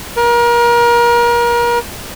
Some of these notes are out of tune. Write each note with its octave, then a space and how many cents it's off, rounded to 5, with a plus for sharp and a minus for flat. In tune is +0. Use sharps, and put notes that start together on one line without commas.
A#4 +30